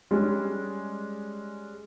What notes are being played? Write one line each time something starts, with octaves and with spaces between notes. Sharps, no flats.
G3 G#3 C#4